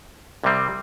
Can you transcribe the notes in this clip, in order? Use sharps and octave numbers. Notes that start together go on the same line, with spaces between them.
C2 C3 G3 C4